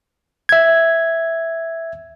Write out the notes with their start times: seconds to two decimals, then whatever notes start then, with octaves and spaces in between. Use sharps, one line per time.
0.49 E5 G#6